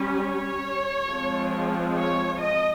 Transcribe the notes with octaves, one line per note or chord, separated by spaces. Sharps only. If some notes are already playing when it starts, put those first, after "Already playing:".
Already playing: G3 C#4
C#5
F3 G#3 C4
C#5
D#5